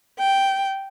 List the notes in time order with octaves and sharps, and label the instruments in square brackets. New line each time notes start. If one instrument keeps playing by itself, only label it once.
[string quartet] G5